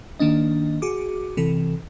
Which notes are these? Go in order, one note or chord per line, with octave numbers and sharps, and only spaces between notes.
D#3 A#3 D4 D#5
F#4 G#4 D6
C3 E3 A4